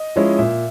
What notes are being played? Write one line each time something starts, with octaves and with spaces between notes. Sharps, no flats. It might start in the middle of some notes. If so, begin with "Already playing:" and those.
Already playing: D#5
F3 G#3 C#4 E4
A#2 E5